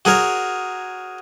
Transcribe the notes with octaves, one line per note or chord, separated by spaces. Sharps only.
F#4 G#4 A#4 C#5